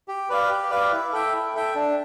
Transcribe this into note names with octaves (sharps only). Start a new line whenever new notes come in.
G4
B4 D5 F5
G4
B4 D5 F5
E4
A4 E5 G5
E4
A4 E5 G5
D4